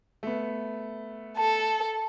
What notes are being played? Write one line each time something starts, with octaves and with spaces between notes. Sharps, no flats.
A3 B3
A4 A5